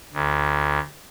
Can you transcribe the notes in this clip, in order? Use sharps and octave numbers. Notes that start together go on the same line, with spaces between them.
D2